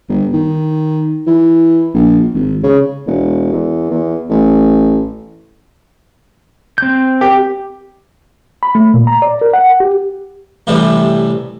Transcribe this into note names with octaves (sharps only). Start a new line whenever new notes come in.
G1
D#3
E3
A#1
G#1
C#3
E1
E2
E2
A1
C4 G6
G4
B5
A3
A#2
A#5
D5
A#4
F#5
G4
A1 A2 C3 E3 G3